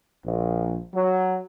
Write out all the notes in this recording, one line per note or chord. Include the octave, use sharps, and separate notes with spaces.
A#1
F#3